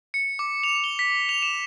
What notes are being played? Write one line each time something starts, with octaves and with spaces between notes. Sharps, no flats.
C#7
D6
F7
G7
B6
F7
E7